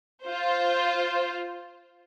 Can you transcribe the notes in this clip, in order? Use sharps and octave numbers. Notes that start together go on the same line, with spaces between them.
F4 C5